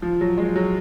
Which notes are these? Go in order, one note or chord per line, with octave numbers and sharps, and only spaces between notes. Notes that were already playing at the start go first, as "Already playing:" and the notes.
F3
F#3
G#3
F#3